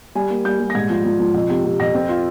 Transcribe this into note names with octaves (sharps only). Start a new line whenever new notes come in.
G3 G#5
A#3
G3 G6
G3
A#6
G#2 G#6
F3
F3
F3
F2
C3
C3
F2 A#6
C4
F4